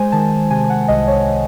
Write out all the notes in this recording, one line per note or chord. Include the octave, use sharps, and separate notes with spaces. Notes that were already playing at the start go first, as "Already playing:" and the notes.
Already playing: G#3 C5 G#5
D#3 A5
C3 G#5
F#5
C2 D#5
C#5